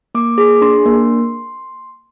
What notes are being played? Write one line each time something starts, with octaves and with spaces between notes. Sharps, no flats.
A#3 D6
G#4 D6
D4 C6
A#3